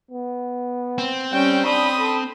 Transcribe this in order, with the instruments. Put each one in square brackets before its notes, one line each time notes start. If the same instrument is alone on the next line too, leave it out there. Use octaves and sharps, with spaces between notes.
[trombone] B3
[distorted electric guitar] C4
[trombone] G3 [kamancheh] C#4 G5
[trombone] D4 [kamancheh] B5 D#6
[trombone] A4